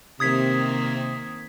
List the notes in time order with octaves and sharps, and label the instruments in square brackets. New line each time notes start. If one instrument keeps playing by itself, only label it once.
[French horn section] C3 [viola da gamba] D#3 A#3 C4 [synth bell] D#6 G#6 B6